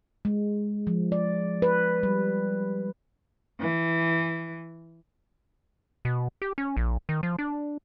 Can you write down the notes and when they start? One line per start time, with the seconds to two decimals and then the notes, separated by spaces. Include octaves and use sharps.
0.25 G#3
0.87 F3
1.12 D5
1.62 B4
2.03 G3
3.58 E3
6.05 B2
6.42 G4
6.58 C#4
6.77 A#1
7.09 D#3
7.23 F3
7.39 D4